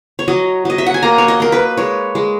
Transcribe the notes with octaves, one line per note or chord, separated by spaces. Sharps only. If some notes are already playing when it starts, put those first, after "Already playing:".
C#5
F#3 D#5
F#3 D#5
E5
F#5
G#5
A#3 A#5
C#5
D#5
A#3 A#4
B4
G#3 C#5
G#3